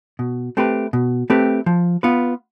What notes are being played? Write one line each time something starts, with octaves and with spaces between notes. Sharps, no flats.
B2
A3 C4 G4 B4
B2
A3 C4 G4 B4
F3
B3 F4 B4